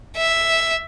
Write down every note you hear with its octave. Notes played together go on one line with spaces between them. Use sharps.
E5